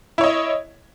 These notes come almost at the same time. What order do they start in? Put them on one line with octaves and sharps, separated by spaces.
E4 C#5 D#5